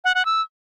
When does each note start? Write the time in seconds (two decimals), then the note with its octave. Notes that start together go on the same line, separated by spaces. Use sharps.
0.04 F#5
0.15 F#5
0.25 E6